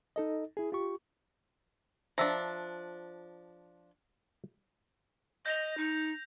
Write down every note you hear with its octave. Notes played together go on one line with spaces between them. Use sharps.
D#4 A4 D#5
E4 G#4
F4 G4 C#6
F3 D4 E5 A#5
D#5 G6 A#6 F7
D#4